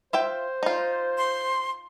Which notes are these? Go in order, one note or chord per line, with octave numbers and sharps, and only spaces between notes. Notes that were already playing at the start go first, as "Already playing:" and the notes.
F4 C5 E5 G5
D#4 F4
C6